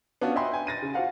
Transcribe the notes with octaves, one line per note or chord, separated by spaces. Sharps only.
B3 C#4 D4 F4 F#4
D#5 E5 G5 G#5 B5 C6
G5 G#5
A6 A#6 D#7
C#3
F4 F#4 C5 F5 F#5